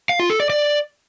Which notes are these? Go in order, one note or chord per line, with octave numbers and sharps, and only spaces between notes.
F5
F4
A4
D5
D5